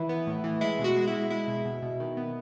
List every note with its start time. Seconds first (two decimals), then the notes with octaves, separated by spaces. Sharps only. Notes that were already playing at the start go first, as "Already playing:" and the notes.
Already playing: E3 E4
0.09 B3
0.27 A2
0.44 E3
0.61 G#3 E4
0.79 B2
0.84 F#4
0.96 G#3
1.07 E4
1.13 G#3
1.30 G#3 E4
1.48 B2
1.65 B2
1.82 B2
2.00 D#3
2.17 B3